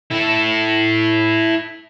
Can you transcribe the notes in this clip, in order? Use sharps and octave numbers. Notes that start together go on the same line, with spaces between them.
E4 A4